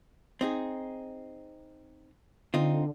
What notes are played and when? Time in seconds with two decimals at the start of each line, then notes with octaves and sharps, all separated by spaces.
0.41 C4 D#4 G#4
2.54 D3 C4 D#4 F4